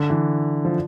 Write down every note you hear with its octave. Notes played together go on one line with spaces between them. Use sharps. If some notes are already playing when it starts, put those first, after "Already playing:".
Already playing: D3
E3
F3